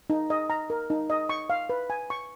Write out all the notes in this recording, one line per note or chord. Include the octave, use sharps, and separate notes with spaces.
D#4
D#5
A#5
A#4
D#4
D#5
C#6
F5
B4
G#5
C#6